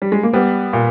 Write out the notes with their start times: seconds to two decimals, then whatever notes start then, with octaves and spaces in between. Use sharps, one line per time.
0.02 G3
0.12 G#3
0.23 A#3
0.33 G3 B3
0.73 A#2